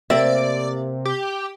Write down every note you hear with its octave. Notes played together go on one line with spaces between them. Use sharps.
C3 A#3 C4 D5 E5
G4